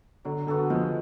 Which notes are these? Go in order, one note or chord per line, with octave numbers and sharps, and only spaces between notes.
D3 F#3
D3 B3 F#4 A4
F3 G#3